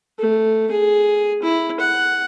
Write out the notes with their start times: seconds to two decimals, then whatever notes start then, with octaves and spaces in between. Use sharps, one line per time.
0.19 A3
0.71 G#4
1.43 E4
1.80 F#5